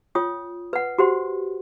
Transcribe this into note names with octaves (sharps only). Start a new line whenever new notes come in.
F4 C#5 G5 D#6
B4 F#5
F#4 G4 C5 F#5